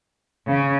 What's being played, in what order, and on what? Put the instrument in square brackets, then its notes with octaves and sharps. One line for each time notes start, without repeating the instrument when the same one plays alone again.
[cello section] C#3